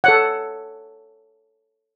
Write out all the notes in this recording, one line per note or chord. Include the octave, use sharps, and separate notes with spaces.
A4 C#5 F#5